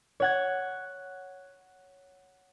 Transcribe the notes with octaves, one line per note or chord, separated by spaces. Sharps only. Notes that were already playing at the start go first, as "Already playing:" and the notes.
C#5 F#5 G#6